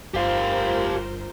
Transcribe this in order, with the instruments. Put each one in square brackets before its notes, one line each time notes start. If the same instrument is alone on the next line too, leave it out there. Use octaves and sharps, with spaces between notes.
[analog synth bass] G1 [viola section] F4 A#4 C5 [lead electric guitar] G4 F5